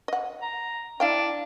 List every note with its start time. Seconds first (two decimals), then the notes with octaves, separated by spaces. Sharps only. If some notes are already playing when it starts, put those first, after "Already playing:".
0.08 D#5 F#5
0.42 A#5
1.00 D4 E4 F5 G5